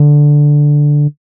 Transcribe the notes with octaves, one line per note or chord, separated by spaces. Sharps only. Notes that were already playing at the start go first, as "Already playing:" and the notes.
Already playing: D3